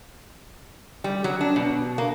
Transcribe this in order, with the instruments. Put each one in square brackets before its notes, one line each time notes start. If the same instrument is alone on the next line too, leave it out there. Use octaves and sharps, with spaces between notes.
[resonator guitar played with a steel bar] G3
F#3
D4
B2
A#3